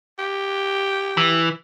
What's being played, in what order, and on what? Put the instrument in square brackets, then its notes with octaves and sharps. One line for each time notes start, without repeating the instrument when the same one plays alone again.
[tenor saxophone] G4
[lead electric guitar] E3